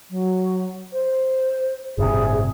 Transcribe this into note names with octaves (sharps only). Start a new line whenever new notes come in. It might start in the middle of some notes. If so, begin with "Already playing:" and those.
F#3
C5
G1 A2 C3 G#4